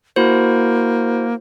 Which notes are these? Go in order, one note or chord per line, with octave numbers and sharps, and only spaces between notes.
A#3 E4 F#4 C5